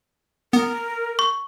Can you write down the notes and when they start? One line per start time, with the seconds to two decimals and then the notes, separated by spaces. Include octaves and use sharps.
0.53 B3 A#4
1.19 C#6